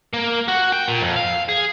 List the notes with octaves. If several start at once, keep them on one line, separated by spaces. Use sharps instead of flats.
A#3
F#4
G5
A#2
F2
F5
G#4